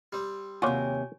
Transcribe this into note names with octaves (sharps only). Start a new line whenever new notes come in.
G3 C4
D#2 C3 F4 F#4 C#5 D5 G#5